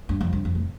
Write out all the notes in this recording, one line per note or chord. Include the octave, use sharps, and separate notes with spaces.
G2
F2
G2
F2
A2